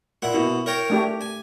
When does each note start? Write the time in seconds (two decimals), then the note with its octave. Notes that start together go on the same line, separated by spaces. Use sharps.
0.22 A#2 E4 F#5
0.34 B2 E4
0.66 A#4 C#5 G5
0.90 A3 D4 G4
1.21 G#5